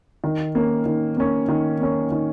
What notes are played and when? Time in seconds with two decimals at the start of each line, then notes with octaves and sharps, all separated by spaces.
0.24 D#3
0.55 A#3 C#4
0.86 D#3
1.17 A#3 C#4
1.49 D#3
1.80 A#3 C#4
2.12 D#3